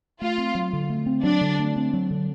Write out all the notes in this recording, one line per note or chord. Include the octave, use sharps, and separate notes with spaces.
A3 F4
C4
F#3
D3
A3
C4
F#3 D4
D3
A3
C4
F#3
D3